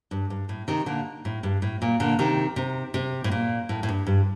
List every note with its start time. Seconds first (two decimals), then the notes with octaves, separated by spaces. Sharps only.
0.11 G2
0.30 G2
0.49 A2
0.68 C3 D#3
0.86 A#2 D3
1.25 A2
1.43 G2
1.62 A2
1.82 A#2
2.00 A#2 D3
2.19 C3 D#3
2.56 C3
2.94 C3
3.24 A2
3.32 A#2
3.69 A2
3.83 A2
3.89 G2
4.07 G2